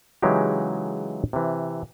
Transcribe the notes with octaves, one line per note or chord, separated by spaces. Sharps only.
C#3 E3 F#3 G#3 D#4 G4
C3 E3